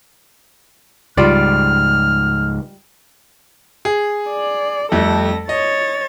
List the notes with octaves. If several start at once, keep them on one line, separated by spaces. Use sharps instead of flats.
C#2 G#2 G3 F4 D5 F6
G#4
D5
F2 G3 A3 A4 A#6
C#5 D#5 A6